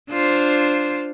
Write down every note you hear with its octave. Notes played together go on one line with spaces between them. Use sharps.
D4 F4 C5